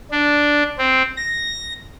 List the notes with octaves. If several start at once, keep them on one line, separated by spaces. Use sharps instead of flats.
D4
C4
A#6